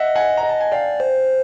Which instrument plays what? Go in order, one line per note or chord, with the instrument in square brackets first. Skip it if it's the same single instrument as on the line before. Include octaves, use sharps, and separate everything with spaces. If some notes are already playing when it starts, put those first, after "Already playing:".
Already playing: [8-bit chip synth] D#5 [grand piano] E5 F#5
[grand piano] F#5 G#5
A#5
[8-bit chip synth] D#5
[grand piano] A5
G#5
[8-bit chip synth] D5 [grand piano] F5 G5
[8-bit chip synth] C5